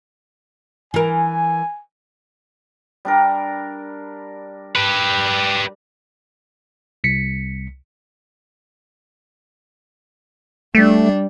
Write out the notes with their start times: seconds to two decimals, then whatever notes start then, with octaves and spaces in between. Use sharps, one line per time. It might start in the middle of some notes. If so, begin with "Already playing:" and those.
0.94 E3 A#4 G#5
3.05 G3 D4 A#4
4.76 G4 B4
7.04 C2 B6 C#7
10.75 G3 A3 D4